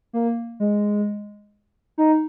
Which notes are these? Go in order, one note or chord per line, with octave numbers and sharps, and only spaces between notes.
A#3
G#3
D#4